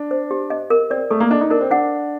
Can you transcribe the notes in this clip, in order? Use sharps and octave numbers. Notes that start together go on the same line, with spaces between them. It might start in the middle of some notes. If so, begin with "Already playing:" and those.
Already playing: D4
C5
G4
D#5
A#4
C4 D5
A3 A4
A#3
D4 D#5
D#4
D4 A#4
C4
D4 F#5